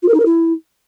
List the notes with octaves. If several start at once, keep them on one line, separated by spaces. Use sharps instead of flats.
F4
A#4
D#4
A#4
E4